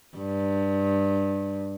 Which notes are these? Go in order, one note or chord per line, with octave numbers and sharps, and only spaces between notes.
G2